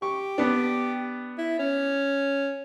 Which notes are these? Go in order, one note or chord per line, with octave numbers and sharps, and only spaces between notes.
G4 C#6
B3 D4
E4
C#4